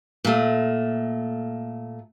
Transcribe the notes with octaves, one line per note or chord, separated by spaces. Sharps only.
A#2 A3